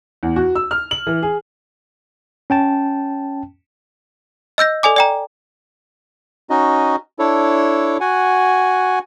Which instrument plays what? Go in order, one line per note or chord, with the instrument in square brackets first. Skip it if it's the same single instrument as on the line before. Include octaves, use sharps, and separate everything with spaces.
[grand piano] E2
F#4
E6
F6
F#7
E3
G#4
[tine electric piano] C#4 G5 A5
[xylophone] D#5 E6 G6 A#6
A4 D5 G#5 D6
D5 G5 A#5
[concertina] C#4 D#4 F#4 D#5
D4 E4 A4 C#5
F#4 F#5 G#5